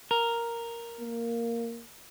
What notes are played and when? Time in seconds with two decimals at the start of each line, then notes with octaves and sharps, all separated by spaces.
0.11 A#4
1.00 A#3